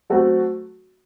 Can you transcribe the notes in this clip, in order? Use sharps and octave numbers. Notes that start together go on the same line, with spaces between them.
F#3 A3 C4 F#4 A4